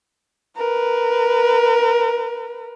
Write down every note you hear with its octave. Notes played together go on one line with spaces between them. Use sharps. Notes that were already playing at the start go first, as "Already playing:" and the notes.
A#4 B4